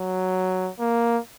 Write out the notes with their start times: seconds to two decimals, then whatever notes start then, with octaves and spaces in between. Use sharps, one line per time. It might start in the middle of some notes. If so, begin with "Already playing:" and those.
Already playing: F#3
0.80 A#3